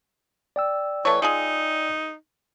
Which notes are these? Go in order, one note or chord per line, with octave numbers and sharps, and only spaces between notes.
D5 G5 E6
E3 A3 C#5
G#3 D#4 F4 G#4